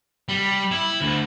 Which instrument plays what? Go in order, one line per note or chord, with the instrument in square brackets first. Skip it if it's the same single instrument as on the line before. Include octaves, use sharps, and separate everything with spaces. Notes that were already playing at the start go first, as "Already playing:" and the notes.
[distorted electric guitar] G3
E4
D2